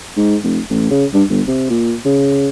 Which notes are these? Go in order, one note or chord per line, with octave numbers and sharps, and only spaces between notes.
G#2
F1
A1
C#3
G2
G1
C3
A#2
C#3